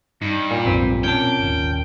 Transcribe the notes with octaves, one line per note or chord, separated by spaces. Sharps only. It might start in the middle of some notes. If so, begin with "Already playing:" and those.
G2 D#4
A#2
A#1 F2 G#2 C4 G4 B4
B2 C4 C#4 A#4 G5 A5
D#1 G#1 D#2